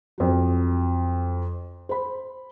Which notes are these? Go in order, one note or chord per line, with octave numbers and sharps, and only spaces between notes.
F2 F#3
C5 B5